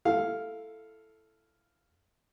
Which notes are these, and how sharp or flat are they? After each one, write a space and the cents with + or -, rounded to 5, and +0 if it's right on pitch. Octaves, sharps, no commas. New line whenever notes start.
E4 +15 A4 +0 F5 +0